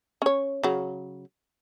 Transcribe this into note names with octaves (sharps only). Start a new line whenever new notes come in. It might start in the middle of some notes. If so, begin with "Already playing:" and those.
C#4 C#5
C#3 F#3